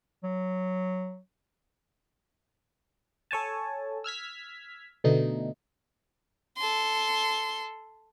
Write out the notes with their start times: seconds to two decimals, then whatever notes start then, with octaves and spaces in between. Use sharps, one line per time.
0.24 F#3
3.31 A4 C#5 G#5 A5
4.04 E6 F6 G#6 B6
5.04 B2 D3 A3 D#4
6.57 A4 C6